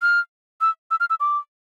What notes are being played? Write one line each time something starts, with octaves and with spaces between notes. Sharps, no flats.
F6
E6
E6
F6
E6
D6